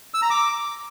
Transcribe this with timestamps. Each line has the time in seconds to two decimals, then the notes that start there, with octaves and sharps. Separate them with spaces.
0.14 E6
0.22 A#5
0.30 D6